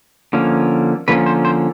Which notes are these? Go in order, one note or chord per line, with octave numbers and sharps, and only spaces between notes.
D3 F3 A#3 C#4
D3 F3 A#3 C#4 B4
C5
C5